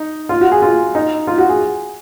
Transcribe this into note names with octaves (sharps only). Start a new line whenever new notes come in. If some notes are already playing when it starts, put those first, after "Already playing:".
Already playing: D#4
F4
F#4
G#4
F4
D#4
F4
F#4
G#4